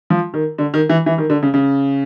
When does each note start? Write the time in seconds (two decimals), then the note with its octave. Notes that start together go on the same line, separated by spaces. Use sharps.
0.10 F3
0.34 D#3
0.58 D3
0.74 D#3
0.89 E3
1.06 E3
1.18 D#3
1.30 D3
1.43 C#3
1.54 C#3